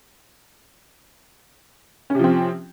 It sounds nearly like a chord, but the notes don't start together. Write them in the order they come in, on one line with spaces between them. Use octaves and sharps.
C#4 C3 F3 C4